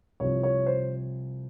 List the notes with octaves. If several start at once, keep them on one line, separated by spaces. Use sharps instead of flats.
C2 C3 F3 C#5
C#5
C5